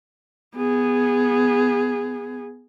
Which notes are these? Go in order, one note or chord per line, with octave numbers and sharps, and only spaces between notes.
B3 G#4